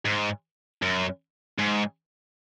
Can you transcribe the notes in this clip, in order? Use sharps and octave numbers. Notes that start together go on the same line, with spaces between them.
G#2
F#2
G#2